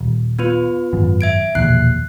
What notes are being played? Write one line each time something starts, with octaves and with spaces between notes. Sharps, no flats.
D#1
B3 F4 B4
G#1 F#2
E5 G#6 D7
E1 A#1 D#2 F#6 C7